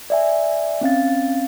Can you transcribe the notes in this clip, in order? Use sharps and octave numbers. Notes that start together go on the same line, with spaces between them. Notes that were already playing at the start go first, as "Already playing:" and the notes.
D5 E5 G#5
C4 C#4 F5 A6